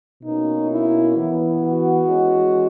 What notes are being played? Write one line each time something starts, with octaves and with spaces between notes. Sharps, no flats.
B2 A#3 C#4 D#4
E4
E3 B3
F#4
E3 G#3 C#4